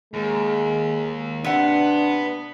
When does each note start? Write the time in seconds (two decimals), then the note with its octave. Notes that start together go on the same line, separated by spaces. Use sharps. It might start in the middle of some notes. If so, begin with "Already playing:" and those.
0.14 D#2 G#3
1.44 C3 B3 D4 F#5